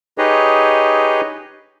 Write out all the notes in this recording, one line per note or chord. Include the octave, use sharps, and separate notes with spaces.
D#4 G4 G#4 B4 C#5 D#5